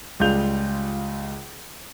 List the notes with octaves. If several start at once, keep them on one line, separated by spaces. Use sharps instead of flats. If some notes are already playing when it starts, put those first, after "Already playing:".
C#2 G3 G#3 F4 G6 F7